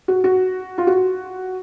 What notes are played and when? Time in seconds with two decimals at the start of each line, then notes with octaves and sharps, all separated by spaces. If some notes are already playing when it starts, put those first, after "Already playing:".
0.08 F#4
0.24 F#4
0.78 F4
0.87 F#4